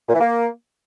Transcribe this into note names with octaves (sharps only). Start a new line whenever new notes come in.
A#2
E3
A#3